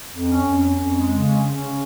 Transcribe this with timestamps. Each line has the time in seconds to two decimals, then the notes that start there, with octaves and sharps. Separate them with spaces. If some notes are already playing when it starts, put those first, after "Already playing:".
0.10 F2
0.27 C#4
0.43 F2
0.60 C#4
0.77 F2
0.94 G#3
1.11 C#3
1.28 C#4
1.45 C#4
1.63 C#3